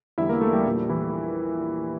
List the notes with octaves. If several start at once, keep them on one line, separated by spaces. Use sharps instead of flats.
E2 D3 G3 E4 E5
A#3 A#4
A3 A4
G3 G4
A#1 A#2 G3
E3 E4